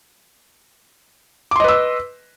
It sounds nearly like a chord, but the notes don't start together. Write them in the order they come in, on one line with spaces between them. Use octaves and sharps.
D6 C6 D#5 B4 E6